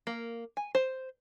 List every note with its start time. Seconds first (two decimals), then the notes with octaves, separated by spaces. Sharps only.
0.07 A#3
0.57 G#5
0.75 C5